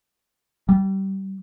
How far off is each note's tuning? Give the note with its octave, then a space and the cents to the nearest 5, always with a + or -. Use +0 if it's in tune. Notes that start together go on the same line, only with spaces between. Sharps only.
G3 -25